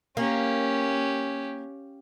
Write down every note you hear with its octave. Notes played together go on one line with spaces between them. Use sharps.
A#3 C#4 G4